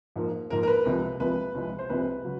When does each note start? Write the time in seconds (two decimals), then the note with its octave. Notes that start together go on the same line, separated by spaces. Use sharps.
0.16 G#2 F3 A#3
0.50 G#2 F3 A#3 A#4
0.63 A#4
0.67 B4
0.85 C2 C3 F3 G#3
1.20 C2 C3 F3 G#3 B4
1.55 C2 C3 F3 G#3
1.79 C5
1.89 C2 C3 F3 G#3 B4
2.24 C#3 F#3